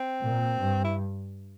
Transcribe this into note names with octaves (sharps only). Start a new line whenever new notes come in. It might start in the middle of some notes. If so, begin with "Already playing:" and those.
Already playing: C4
A#2
G2
E4